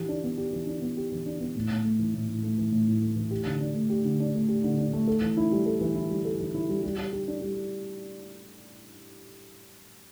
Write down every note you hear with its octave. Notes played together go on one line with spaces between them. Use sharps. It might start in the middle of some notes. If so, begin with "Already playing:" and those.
Already playing: E3 G4
D4
B3
G4
E3
D4
B3
G4
E3
D4
B3
A2
A2
A3
E3
A2
A2
A3
E3
A2
A2
A3
E3
G4
D3
D4
A3
G4
D3
D4
A3
G4
D3
D4
A3
A4
E3
E4
G3
A4
E3
E4
G3
A4
E3
E4
G3
G3
G3
G4
D4
G3